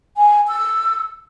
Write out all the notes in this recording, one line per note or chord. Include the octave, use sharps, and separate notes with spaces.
G#5
E6